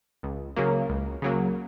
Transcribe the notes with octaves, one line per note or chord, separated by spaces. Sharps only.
C#2
C#3 F#3 A#3
C#2
C#3 F#3 A#3